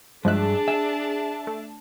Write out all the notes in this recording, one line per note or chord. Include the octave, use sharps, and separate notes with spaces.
G2 F3 G#3 D4 G#4 E5 A5 F#6
E5 G#5
A3